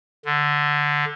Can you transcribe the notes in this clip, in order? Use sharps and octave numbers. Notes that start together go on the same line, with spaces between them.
D3